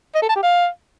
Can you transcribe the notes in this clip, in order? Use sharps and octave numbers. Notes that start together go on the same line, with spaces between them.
D#5
A4
A5
G4
F5